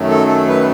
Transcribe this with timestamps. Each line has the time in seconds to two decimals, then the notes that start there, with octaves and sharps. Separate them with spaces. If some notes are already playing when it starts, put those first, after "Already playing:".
Already playing: F#2 D#3 F#3 A3
0.09 A4
0.28 A4
0.48 B4